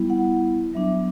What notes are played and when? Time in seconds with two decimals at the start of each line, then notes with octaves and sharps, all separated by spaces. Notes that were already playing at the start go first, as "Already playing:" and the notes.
Already playing: G3 B3 E4
0.10 F#5
0.74 F#3 B3 D4 E5